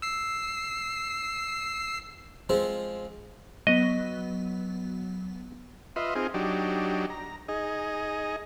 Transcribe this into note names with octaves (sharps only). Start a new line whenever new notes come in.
E6 C7
F3 G#3 C4
F#3 B3 D#5
F4 B4 D#5 E5 C6
C4 D#4 F4 G#4
F#3 D4 D#4 G4
A#5
D#4 G#4 D#5